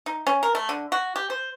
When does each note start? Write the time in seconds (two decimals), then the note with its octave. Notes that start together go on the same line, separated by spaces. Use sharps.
0.06 D#4
0.27 C#4
0.43 A#4
0.55 A3
0.69 D3
0.92 F#4
1.16 G4
1.30 C5